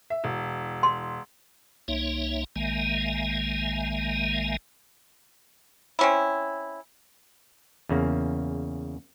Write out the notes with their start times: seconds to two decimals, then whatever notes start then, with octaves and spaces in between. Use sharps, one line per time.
0.10 E5
0.24 E1
0.83 C6
1.88 C2 A#3 D#4 C#5 E5
2.56 A#1 D#3 G#3 A#3 E5 G#5
5.99 C4 C#4 E4
7.89 E2 C#3 A#3